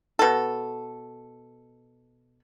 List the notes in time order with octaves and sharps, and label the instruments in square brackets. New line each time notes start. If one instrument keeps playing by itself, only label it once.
[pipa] B2 A4